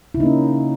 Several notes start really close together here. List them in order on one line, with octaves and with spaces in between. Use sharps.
E4 C#3 D#4 A#3 C#4